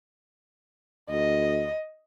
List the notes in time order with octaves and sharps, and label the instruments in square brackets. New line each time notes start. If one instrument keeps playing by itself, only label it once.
[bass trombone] D2 [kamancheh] D#5